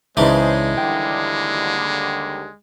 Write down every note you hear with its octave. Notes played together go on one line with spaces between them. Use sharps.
C#2 C#3 E3 G#3 D4 D#4 G#4 C5
D#2 D3 G3 G5